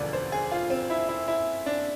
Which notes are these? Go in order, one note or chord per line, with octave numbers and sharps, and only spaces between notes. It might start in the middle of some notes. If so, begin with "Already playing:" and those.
Already playing: E1 D2 D3 F3 B4 D5
C5
G#4
F4
C4
E4
E4
E4
D4